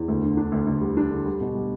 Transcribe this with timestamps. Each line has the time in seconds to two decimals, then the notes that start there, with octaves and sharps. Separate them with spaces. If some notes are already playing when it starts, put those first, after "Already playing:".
Already playing: E2
0.08 D2
0.22 D3
0.37 D4
0.52 D2
0.67 D2
0.81 G3
0.97 D4
1.11 D3
1.26 G3
1.41 B2
1.55 G3